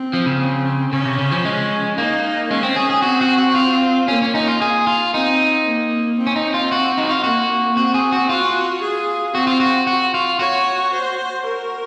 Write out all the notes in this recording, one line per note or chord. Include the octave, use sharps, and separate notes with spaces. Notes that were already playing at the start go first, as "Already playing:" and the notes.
Already playing: C4
F3
C#3
C4
C#3 C#4
C3
C#3
F3
G#3
A#3 D#4
G#3 C#4
C4
G#4
G#4
C4 F#4
F#4
F#4
F4
A#3 C#4
C#4
D#4
F4
G#4
F4
C4 D#4
A#3
C4
C#4
D#4
F4
F#4
D#4
F4
A#3 F#4
C4 F#4
G#4
F#4
F4 F#4
G#4
C4 F#4
F4
F#4
F#4
F4
F#4 C#5
C5
A#4